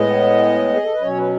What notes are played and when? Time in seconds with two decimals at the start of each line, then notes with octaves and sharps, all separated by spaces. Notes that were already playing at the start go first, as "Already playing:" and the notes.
Already playing: A2 G#3 B3 D#5
0.74 G#4
0.84 A4
0.93 B4
1.02 B2 F#3 C#4 C#5
1.17 B4